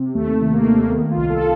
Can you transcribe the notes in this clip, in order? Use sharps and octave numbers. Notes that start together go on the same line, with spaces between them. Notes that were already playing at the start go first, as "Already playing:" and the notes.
Already playing: C3
D#2 A3
D#3
A#3
D#3
D#3 B3
F4
C2
A4